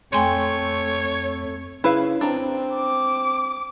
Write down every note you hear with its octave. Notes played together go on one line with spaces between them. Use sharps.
F2 A3 C#5 G5 G#5 C6
C#3 E4 B4 F5
C4 D4 A#5
D6